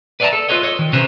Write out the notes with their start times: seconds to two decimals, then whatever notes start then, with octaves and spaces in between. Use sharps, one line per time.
0.20 B4 D5 E5 F5 A5 A#5
0.33 A4
0.49 F4 F#4 B4 C#5 D#5
0.62 A4 C#5 D#5
0.79 D#3
0.93 C3 C#4 B4 C5 A#5